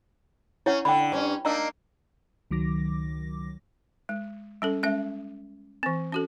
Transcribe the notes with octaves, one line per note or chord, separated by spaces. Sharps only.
C#4 E4 C#5 F#5
D3 G5 B5
G2 C#4
A#3 D4 D#4 A#5 E6
C#2 D#3 F#3 D6 A#6
G#3
G3 C#4 A4
G#3 C#4 E5
E3 C4
C#4 F#4 A4